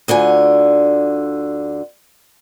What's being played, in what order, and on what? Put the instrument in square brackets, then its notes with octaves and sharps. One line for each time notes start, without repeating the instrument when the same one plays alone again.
[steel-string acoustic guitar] D2 D3 F4 G#5